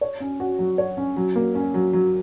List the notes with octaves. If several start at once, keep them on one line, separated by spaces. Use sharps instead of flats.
C#5
C#4
F#4
F#3
C#5
C#4
F#3
A#3
C#4
F#3
F#3